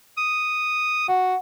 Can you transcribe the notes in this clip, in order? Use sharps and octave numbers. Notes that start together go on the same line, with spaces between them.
D#6
F#4 F#5